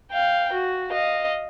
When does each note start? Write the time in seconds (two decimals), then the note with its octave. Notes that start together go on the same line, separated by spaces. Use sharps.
0.12 F5 G5
0.52 F#4
0.91 D#5 F5